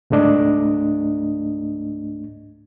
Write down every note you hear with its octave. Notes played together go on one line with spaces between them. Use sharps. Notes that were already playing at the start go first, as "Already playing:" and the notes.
C#2 G#2 A3 D4 D#5